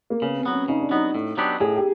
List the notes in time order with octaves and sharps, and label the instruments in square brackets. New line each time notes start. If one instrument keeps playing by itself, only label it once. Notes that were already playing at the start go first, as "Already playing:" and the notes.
[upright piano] A#3
[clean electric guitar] C#3 [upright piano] B3
[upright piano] C4
[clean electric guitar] F#3 B3
[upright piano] C#4
[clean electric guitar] C#3 [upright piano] D#4
[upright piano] D4
[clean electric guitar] F#3 B3 [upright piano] D#4
[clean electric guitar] A2
F#3 B3 D4 G4
[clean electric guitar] A2 [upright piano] G#4
[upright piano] G4